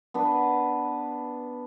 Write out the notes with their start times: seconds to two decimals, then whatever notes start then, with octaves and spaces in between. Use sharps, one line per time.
0.14 B3 D4 B4